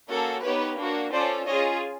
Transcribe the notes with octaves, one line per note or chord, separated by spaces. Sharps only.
A#3 C#4 F#4 A4
B3 D#4 G4 B4 C#5
A#3 D4 F#4
C#4 F4 A4 C5 D5
C#4 F4 G#4 C#5 D#5